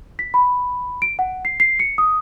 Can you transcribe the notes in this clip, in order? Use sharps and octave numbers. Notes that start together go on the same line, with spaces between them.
B6
B5
D7
F#5
C7
C7
C#7
D#6